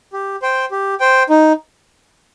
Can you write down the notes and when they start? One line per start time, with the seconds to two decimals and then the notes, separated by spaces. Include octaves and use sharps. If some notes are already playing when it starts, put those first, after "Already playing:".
0.13 G4
0.42 C5 G5
0.71 G4
1.00 C5 G5
1.29 D#4